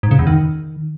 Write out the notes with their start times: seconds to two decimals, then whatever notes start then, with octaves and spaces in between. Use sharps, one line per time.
0.03 G#2
0.11 C#3
0.19 E2
0.27 D#3